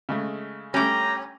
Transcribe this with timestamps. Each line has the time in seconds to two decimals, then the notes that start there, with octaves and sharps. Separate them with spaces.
0.09 C#3 G#3 A3
0.74 G3 A3 C#4 G5 A#5 D6